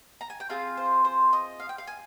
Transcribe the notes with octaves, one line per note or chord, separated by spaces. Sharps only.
A#5
G#5
G5
C4 F4 G#4 F5
C5
C5
D#5
F5
G5
F5
G#5